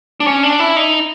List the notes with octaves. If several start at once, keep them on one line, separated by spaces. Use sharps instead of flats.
D4
C#4
D4
E4
D#4